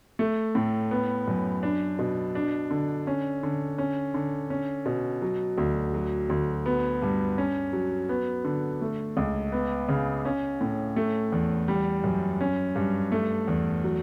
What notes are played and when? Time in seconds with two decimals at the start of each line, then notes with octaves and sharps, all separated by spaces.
0.19 A3
0.55 A2
0.91 B3
1.28 F#2
1.63 D4
1.99 B2
2.35 D4
2.71 D3
3.07 C#4
3.43 D3
3.78 C#4
4.14 D3
4.50 C#4
4.86 B2
5.22 F#3
5.58 D2
5.94 F#3
6.29 D2
6.66 B3
7.02 G2
7.38 C#4
7.73 F#3
8.09 B3
8.45 D3
8.82 A3
9.17 C#2
9.52 B3
9.89 C#3
10.25 C#4
10.61 A2
10.96 A3
11.32 E2
11.68 G3
12.04 F#2
12.41 C#4
12.76 G2
13.12 A3
13.48 E2
13.84 F#3